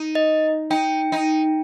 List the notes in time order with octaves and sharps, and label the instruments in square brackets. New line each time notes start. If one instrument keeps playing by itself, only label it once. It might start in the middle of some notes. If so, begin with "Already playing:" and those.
Already playing: [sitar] D#4
[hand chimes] D#5
[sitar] D#4 [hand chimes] G5
[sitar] D#4